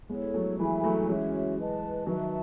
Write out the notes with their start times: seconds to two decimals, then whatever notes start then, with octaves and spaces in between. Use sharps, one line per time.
0.09 G#3 B3 E4 A4 C#5
0.34 F#3 A3
0.59 E3 G#3 A4 E5 G#5 B5
0.84 F#3 A3
1.08 E3 G#3 C#4 F#4 C#5 E5
1.57 B4 D#5 A5
2.07 D#3 F#3 B4 E5 A5